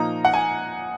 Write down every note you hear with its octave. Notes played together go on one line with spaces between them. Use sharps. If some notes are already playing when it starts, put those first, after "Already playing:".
Already playing: A#2 F3 A#3 D#4 A#5
F#5
G#5